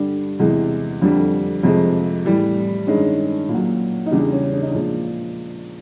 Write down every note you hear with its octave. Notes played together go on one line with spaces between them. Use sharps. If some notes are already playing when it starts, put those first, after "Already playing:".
Already playing: G2 D3 G3 D4
E2 C3 E3 G#3
F2 D3 G3 D4
F2 C3 F3 G#3
A2 E3 G3
G2 D#3 G#3 C#4
A#2
F#3
D#4
E2 C#3 E3 G3 D4
C#4
D4
D#4
D4
A#2 F3 G#3